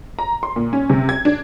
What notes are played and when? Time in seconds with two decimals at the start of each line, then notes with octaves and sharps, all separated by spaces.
0.19 A#5
0.43 C6
0.56 A#2
0.73 C#4
0.90 C3
1.09 G#6
1.25 D4